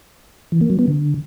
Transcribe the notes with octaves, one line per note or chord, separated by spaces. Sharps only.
E3
A#3
F#3
B3
D3